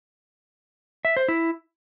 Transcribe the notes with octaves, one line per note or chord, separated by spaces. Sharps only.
E5
C5
E4